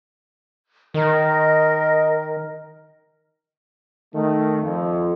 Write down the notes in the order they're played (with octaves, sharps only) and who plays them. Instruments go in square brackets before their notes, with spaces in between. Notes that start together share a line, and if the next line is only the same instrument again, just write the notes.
[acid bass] D#3 [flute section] A#4 D#5
[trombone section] D#3 A3
F2